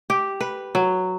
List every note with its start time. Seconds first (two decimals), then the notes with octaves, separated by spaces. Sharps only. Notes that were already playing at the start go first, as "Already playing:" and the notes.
0.10 G4
0.41 B4
0.75 F#3